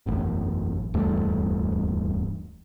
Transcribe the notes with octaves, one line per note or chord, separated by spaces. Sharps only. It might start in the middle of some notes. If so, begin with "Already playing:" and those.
E1 A1 F#2 A2
D1 E2 G2 A3